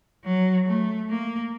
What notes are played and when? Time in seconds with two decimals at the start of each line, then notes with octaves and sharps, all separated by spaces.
0.24 F#3
0.66 A3
1.09 A#3